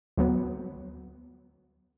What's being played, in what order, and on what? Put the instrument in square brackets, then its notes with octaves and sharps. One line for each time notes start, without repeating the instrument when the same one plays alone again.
[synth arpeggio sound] D2 F#3 B3